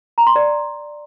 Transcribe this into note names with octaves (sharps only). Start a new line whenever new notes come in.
A#5
C6
D5